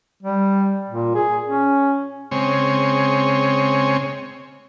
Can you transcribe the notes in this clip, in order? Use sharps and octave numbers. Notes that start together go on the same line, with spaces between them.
G3
A#2
G#4
C#4
C#3 G#3 C4 C#5